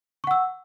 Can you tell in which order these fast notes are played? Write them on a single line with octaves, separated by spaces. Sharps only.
C#6 F#5 E6